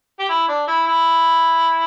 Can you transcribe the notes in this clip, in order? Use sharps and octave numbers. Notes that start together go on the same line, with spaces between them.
G4
E4
D4
E4
E4